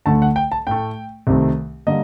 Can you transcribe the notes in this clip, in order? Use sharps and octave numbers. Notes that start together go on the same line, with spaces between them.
D2 D3 A3 A5
F#5
G5
A5
A2 A3 G5
C2 C3 D#3 A3
D3 G3 A#3 D#5